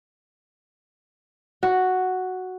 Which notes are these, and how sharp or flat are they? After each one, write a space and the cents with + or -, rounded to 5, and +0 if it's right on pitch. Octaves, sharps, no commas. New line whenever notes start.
F#4 +0